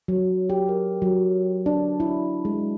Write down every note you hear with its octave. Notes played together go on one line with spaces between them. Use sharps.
F#3
G4
A#4
F#3
D4
E4
G#3